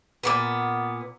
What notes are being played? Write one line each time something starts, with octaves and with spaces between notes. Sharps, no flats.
A#2 C#3 B3